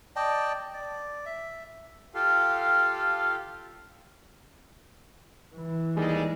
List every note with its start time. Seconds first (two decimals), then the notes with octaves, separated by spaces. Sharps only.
0.16 D5 D#5 G5 A5
0.74 D5
1.26 E5
2.14 F4 G4 A4 F5
5.55 E3
5.96 D#2 G3 G#3